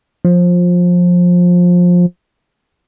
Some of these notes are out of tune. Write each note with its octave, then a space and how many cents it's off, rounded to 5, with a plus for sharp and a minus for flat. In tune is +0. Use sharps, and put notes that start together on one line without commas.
F3 +20